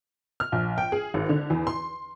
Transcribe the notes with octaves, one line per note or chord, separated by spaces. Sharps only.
F6
A#1
G5
G#4
G#1
D3
E2
C6